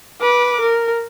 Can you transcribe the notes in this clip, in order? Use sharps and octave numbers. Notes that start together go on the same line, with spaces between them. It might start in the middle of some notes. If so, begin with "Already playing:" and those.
B4 D6
A#4